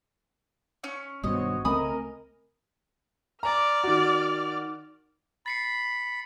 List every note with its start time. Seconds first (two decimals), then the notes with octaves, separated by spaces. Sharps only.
0.84 C#4 C#6
1.24 G#1 G2 B2 F#4 C5 C#5 D#5
1.65 C#2 A3 C4 A#4 D#5 G#5 B5 D#6
3.43 D5 A#5 F6
3.84 D#3 F#4
5.46 B5 A6 C7 C#7